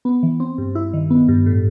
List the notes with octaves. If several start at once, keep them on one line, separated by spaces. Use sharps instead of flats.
B3
E3
C4
G2
E4
D#3
B3
G2
A2